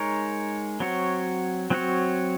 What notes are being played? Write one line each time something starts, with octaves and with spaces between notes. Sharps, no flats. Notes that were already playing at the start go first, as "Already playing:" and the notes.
Already playing: G#3 D#4 A#4 C#5
F#3 C4 F#4 C#5
F#3 C4 F#4 C#5